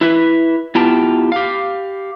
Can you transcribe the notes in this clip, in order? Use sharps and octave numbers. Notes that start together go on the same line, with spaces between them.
E4 B4 E5
B3 E4 F4 G4 G5 A5
G4 F5